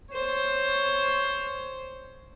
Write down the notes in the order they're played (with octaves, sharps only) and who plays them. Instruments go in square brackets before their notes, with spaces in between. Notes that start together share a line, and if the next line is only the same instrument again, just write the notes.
[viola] C5 C#5